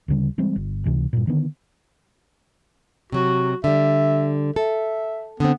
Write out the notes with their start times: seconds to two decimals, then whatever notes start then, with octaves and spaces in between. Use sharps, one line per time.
0.08 D2 C#3 G3
0.38 E3 G3 G#3 C4
0.56 G1
0.86 C#2 C3 E3
1.13 G2 A#2
1.27 D3 D#3 B3
3.12 C3 F#3 F#4
3.64 D3 G3 E5
4.56 A4 E5
5.40 D3 B3 C4